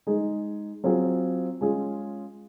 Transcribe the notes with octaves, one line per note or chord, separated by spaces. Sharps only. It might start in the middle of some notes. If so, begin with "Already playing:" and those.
G#3 D#4 G#4
F#3 C4 F4 G#4
G#3 C#4 F4 G#4